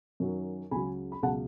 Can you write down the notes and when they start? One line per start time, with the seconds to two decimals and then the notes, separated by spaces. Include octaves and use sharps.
0.20 F#2 D#3 F#3
0.71 C#2 C#3 F#3 G#5 B5
1.12 B5
1.23 C#2 B2 F#3 F#5 A5